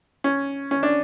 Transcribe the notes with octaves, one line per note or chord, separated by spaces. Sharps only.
C#4
C#4
D4